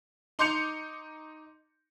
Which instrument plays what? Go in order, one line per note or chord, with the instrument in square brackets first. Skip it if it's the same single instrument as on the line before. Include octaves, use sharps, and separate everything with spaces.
[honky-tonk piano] D#4 C6 D6 G6 C#7 F7